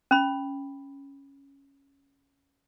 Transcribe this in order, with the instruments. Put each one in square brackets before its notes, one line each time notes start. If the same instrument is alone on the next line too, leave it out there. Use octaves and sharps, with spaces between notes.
[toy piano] C#4 B5